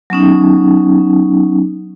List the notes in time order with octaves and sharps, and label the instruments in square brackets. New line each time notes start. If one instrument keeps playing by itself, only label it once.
[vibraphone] F#3 B3 C#4 D#4